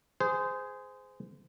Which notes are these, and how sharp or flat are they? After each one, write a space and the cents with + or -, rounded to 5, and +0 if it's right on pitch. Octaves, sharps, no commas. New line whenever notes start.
G#4 +0 C5 -25